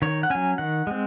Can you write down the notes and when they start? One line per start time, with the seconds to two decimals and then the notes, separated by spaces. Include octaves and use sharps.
0.02 D#3 C#5
0.23 F#5
0.30 F#3 C#4 G#5
0.58 D#3 F#5
0.87 G#3 C4